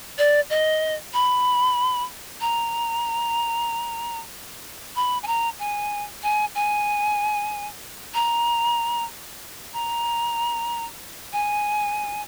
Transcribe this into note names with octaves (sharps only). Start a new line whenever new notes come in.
D5
D#5
B5
A#5
B5
G#5
A#5
G#5
G#5
G#5
A#5
A#5
G#5